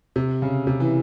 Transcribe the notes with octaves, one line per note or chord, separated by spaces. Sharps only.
C3
C#3
C3
E3